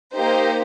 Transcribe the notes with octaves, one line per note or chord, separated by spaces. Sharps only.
A#3 D#4 G4 C5